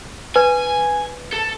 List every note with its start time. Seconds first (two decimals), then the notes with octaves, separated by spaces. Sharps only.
0.36 B4 G#5
1.33 A4